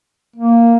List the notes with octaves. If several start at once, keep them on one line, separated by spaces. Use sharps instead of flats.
A#3